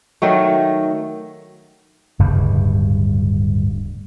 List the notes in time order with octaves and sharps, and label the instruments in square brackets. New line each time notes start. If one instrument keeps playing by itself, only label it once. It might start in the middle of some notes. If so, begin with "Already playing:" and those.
[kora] D#3 F#3 A3
[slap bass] D1 G2 C#3 G3